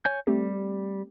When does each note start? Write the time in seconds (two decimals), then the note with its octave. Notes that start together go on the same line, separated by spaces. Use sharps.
0.05 C#5 G#5 G6
0.27 G3 A3 C4 G4